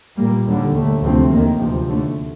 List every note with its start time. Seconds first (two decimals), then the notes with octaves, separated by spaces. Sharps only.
0.17 A#2 G3 A#3
0.45 D#2 D3 G3
0.73 D#2 D3 A3
1.02 D2 C3 F3 A3 C4
1.30 D#2 D#3 A#3
1.59 D2 C3 F3
1.87 D#2 D3 A3